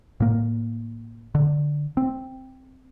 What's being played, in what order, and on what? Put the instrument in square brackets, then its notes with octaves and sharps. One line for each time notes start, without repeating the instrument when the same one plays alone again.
[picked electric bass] A2 A#3
D3
C4